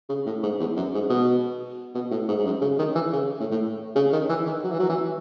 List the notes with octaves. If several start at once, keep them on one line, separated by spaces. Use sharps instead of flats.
C#3
A2
G#2
E2
F#2
G#2
B2
B2
A2
G#2
G#2
F#2
C#3
D#3
E3
C#3
A2
A2
C#3
D#3
E3
D#3
F#3
E3
F#3
E3